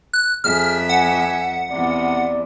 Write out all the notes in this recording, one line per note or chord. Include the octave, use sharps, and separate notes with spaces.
F#6
F2 G#4 E5 F6
F#5 G#5
E2 C3 D5